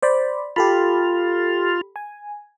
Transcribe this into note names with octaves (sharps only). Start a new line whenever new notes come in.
C5 D5 B5
F4 G4 A4 B5
G#5